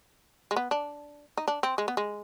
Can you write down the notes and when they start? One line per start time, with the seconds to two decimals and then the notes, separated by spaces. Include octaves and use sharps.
0.51 G#3
0.56 B3
0.71 D4
1.37 D#4
1.48 D4
1.63 C4
1.78 G#3
1.88 B3
1.97 G#3